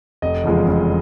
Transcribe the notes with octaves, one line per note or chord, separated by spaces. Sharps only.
F1 D#5
E2 C#3 F3 G#3
F1